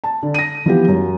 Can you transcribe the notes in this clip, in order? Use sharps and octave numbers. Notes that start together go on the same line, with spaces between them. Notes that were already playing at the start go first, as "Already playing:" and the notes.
A5
D3
A#6 D#7
E3 F3 B3 G4
F#2